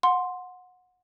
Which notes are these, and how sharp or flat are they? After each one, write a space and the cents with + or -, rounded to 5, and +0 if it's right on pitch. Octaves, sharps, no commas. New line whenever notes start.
F#5 -25 C6 +0